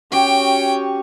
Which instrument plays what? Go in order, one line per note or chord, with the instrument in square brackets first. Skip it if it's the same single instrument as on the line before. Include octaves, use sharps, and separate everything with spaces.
[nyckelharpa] C#4 C#5 [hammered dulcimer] F#4 G4 [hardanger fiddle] G5